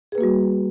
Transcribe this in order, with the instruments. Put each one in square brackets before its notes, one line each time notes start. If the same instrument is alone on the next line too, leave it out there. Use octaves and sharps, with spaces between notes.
[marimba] G#4
B4
A#3
F#4
G3